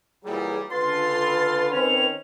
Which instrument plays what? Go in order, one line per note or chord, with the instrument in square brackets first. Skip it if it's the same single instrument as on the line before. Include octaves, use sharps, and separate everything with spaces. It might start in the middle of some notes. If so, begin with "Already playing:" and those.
[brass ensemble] A#2 E3 F#3 [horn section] G3 [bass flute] G#4
[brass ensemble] C#2 D3 F4 [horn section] A4 C6 [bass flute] B4 [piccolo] A6
[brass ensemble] D#3 C4 C#4 [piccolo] F7